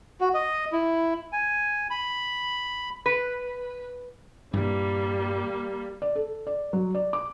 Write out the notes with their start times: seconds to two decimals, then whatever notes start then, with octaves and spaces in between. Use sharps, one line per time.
0.21 F#4
0.34 D#5
0.72 E4
1.33 G#5
1.90 B5
3.06 B4
4.53 G2 A#2 E3 G3 A#3
6.02 D5
6.16 A4
6.47 D5
6.73 F#3
6.95 D5
7.13 D6